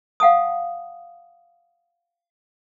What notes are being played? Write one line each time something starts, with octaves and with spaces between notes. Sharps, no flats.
F5 F#5 A5 D#6